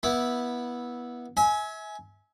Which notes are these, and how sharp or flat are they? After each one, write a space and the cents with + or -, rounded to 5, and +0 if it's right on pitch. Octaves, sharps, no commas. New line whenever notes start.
B3 -20 E4 -10
E5 -30 G#5 +15